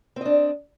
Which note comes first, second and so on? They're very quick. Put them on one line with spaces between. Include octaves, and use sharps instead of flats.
C4 D#5 D4